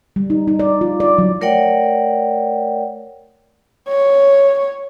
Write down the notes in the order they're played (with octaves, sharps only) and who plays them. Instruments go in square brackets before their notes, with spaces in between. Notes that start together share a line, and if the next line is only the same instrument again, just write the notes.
[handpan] G3
D#4
D#4
D5
F4
D5
F#3
[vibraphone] A3 A#4 C#5 D5 F#5 G5
[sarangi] C#5